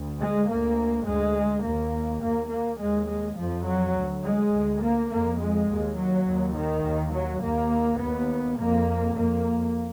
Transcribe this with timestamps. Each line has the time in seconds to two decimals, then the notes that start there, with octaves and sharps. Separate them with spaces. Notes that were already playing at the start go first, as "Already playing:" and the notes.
Already playing: D2
0.20 G#3
0.49 D2 A#3
1.06 D2 G#3
1.64 D#2 A#3
2.22 D#2 A#3
2.51 A#3
2.80 D#2 G#3
3.08 G#3
3.37 F2 F3
3.66 F#3
3.95 D2
4.24 G#3
4.53 D2
4.82 A#3
5.11 F2 A#3
5.39 G#3
5.69 D#2
5.97 F#3
6.26 D#2
6.55 D#3
6.84 D#2
7.13 F#3
7.42 D#2 A#3
7.99 D#2 B3
8.57 F2 A#3
9.15 F2 A#3